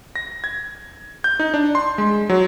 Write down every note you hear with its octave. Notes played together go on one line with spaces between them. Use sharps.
A#6
G#6
G6
D#4
D4
C6
G#3
F#3